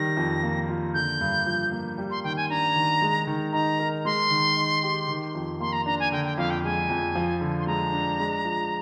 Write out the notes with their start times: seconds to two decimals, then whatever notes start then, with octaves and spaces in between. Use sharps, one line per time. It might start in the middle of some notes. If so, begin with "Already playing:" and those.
Already playing: D#3 G3 A#6
0.17 F2
0.43 A#3
0.68 F4
0.94 D3 G6
1.21 G2
1.46 F3
1.72 A#3
1.98 G3
2.10 C6
2.24 D#3 G5
2.37 G#5
2.50 D4 A#5
2.75 D#3
3.02 G#3
3.27 D#3
3.53 D#4 A#5
3.79 A#4
4.05 G#3 C6
4.31 D#3
4.57 D#4
4.83 G4
5.08 D#3
5.35 F2
5.60 A#3 C6
5.72 A#5
5.86 D4 A#5
6.00 G#5
6.12 D3 G5
6.25 G5
6.38 F2 F5
6.50 G5
6.64 G#3 G#5
6.89 F2
7.15 F3
7.41 D3
7.60 C6
7.67 G#3 A#5
7.92 D4
8.19 G#3
8.45 F3